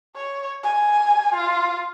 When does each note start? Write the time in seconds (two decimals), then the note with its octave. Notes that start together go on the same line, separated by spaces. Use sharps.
0.16 C#5
0.63 G#5
1.34 F4